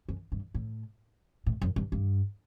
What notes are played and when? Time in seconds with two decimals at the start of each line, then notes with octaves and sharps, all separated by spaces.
0.09 F#2
0.32 G2
0.55 A2
1.46 A2
1.62 F#2
1.76 G2
1.92 G2